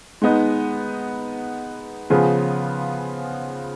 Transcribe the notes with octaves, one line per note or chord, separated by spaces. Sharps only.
G#3 B3 D#4
C#3 F3 B3 F4 G#4